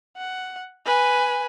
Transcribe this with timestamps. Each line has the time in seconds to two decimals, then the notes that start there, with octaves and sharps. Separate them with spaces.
0.17 F#5
0.86 B4 G#5